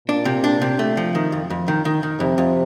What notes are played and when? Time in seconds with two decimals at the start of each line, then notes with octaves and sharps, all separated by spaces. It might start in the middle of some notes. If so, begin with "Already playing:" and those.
0.08 A#2 D4
0.25 C3
0.44 D4
0.62 C3
0.79 A3
0.97 F3
1.15 D#3
1.32 F2
1.50 F2
1.68 D#3
1.85 D#3
2.03 D#3
2.20 F2 C3
2.38 F2